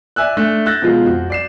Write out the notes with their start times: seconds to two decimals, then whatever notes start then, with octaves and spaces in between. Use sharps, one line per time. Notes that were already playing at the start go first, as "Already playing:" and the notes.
0.16 D5 E5 G#5 E6 F#6
0.37 A3 D4 F#6
0.66 E6 F#6 G6 A6 A#6
0.82 B2 F3 G#3 F4
1.06 F2 F#4
1.30 D5 C7 E7